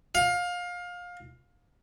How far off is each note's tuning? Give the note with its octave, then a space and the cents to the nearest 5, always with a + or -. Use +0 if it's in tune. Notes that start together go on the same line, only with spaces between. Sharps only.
F5 +25